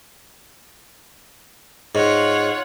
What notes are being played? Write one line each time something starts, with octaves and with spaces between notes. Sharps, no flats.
G#2 F4 C#5 F#5